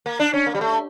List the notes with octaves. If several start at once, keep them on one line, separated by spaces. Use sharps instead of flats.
A#3
D4
C#4
A#3
G3
A3